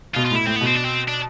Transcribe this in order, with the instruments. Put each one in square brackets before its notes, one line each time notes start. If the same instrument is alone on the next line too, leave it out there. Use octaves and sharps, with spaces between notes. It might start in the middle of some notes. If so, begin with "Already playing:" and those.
[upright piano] B2 [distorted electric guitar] F4
[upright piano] A2 [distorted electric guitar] F4
[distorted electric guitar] E4
[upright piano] A2 [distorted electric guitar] C4
[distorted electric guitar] B3
[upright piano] B2
[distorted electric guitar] C4
D4
C4
D4